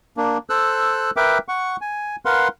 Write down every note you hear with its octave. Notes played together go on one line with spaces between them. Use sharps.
A#3 D4
A4 C5 E6 F#6
A#4 B4 E5 G5 D6
F#5 C#6
G#5
A#4 B4 F5 F#5 C6